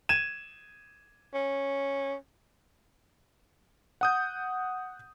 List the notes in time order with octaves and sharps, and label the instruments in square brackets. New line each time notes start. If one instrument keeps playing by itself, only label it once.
[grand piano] G#6 D#7 E7
[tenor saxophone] C#4
[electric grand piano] F#5 D#6 G6